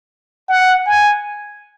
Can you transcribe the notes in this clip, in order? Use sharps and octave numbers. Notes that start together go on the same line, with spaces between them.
F#5
G#5